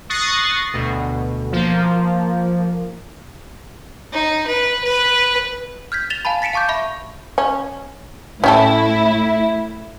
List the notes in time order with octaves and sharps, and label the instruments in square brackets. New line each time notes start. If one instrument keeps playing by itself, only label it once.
[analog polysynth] C#6 D#6 F#6 A6 A#6 C7
D2 B2
F3 A#3
[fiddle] D#4
B4
B4
[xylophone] F6 G6 G#6 B6
A6 E7 F7 G7
F5 G#5 A5 B5
A6 B6 C#7 D7 E7
F5 A5 C#6 D6 G6
E5 B5 C#6
[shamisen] C#4
[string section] A2 E4 [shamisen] C#4 G4 A4